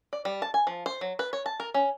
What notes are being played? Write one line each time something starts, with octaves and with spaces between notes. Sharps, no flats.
D5
G3
A5
G#5
F3
C5
F#3
B4
C#5
A5
A#4
C#4